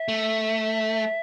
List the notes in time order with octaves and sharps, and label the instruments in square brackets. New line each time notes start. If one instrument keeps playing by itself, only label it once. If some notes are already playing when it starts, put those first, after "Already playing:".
Already playing: [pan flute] E5
[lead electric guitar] A3